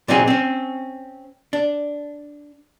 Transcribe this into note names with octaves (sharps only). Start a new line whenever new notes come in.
A#2 F#3 C4 D#4 E4 G#4
C4 C#4
D4